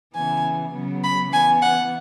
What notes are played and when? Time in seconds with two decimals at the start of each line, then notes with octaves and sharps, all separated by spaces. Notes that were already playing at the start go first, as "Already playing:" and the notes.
0.14 C#3 E3 B3 G#5
0.74 C#3 F#3 B3
1.03 B5
1.32 E3 B3 G#5
1.61 F#5